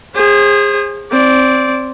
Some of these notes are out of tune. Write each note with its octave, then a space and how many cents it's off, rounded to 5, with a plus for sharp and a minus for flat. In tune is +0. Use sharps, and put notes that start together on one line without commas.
G#4 -20 C5 +35
C4 +5 D5 -15